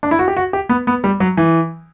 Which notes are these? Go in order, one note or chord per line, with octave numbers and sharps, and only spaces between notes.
D4
E4
F#4
G4
F#4
G4
B3
B3
G3
F#3
E3